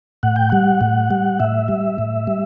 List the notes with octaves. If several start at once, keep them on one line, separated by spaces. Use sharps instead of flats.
A2 F#5
G5
G3 F#5
A2
G3
A2 E5
G3
A2
G3